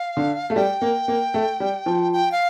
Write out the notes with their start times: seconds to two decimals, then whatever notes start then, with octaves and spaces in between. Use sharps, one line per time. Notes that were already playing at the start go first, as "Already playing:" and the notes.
Already playing: F5
0.17 D3
0.50 A3
0.56 G3 G5
0.82 A#3
1.08 A#3
1.34 A3
1.60 G3
1.86 F3
2.13 G5
2.32 F5